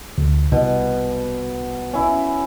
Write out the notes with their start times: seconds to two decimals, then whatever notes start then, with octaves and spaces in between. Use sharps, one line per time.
0.18 D2
0.52 C2 B2
1.93 C#4 E4